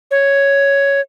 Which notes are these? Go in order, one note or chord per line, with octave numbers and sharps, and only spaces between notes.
C#5